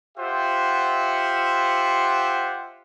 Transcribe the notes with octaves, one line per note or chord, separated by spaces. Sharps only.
F4 G4 C5 E5 F#5